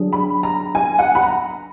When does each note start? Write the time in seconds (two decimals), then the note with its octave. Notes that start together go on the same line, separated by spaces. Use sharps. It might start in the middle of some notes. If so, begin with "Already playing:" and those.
Already playing: F#3 D4 G#4
0.13 B5
0.43 A#5
0.75 G#5
0.99 F#5
1.15 B5
1.22 A#5